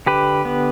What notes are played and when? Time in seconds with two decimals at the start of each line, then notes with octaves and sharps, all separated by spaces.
0.06 D3 G4 B4
0.45 B3